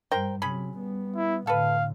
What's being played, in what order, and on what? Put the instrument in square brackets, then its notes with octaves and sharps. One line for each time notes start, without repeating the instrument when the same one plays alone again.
[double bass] G2 G3 [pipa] A#4 C5 G5
[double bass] C3 F#3 [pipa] C#4 G#4 B5
[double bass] G3 B3
[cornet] E4
[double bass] A2 D3 [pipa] A4 B4 [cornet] F5